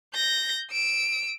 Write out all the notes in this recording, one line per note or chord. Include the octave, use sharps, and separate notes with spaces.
G6 A#6
E6 D7